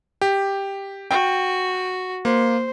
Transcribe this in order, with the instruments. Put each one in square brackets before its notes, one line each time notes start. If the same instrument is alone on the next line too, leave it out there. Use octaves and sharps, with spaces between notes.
[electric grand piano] G4
[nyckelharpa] F#4 [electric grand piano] G5
[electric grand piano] A#3 [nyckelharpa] C5